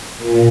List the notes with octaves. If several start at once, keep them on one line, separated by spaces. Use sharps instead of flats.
A#2